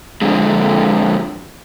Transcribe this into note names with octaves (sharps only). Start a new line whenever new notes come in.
F2 D3 G#3